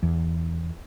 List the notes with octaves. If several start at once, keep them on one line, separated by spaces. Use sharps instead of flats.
E2